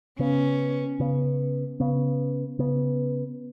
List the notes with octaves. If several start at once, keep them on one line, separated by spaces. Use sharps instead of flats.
C#3 B3 C#4
C#3 B3
C#3 B3
C#3 B3